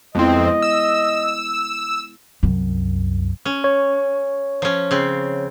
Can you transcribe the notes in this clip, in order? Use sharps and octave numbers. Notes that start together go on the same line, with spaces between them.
F2 G#3 B3 C4 E4 D#5
E6
C2 F#2
C#4
C#5
F3 C#4
C#3 C4